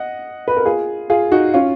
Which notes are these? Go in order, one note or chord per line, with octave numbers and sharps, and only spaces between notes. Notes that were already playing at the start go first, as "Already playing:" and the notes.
Already playing: D#5 F#5
B4
A#4
F4 G#4
F4 G#4
D#4 F#4
C#4 F4